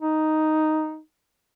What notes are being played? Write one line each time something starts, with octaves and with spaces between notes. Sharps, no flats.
D#4